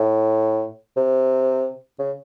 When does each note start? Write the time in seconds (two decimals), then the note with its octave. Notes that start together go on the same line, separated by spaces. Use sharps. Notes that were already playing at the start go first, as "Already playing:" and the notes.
Already playing: A2
0.97 C3
1.99 C#3